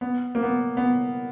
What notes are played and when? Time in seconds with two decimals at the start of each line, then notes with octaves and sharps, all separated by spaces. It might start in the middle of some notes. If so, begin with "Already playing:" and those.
0.01 B3
0.35 A#3
0.43 B3
0.77 B3